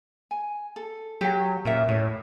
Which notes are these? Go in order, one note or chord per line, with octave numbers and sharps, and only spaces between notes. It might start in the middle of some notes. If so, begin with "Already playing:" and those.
G#5
A4
F#3 G4 G5
A#2 C#4 A#4 E5
A2 C#5